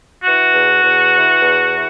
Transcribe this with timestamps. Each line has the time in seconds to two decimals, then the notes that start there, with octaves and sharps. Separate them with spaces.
0.24 E3 F#4
0.53 E2
0.83 E2
1.13 E3
1.42 E2
1.72 E3